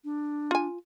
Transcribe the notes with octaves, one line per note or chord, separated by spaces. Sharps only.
D4
F4 G#5